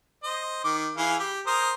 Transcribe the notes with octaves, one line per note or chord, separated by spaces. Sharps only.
C5 D#5
D#3 D6
E3 G#4 F5
G4
A#4 C5 D#6